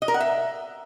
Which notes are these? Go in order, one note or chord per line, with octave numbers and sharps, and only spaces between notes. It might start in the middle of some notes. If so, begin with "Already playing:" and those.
D#5
A#4
F#5
E5